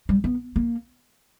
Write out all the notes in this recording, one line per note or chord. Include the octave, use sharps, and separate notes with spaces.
G3
B3
A#3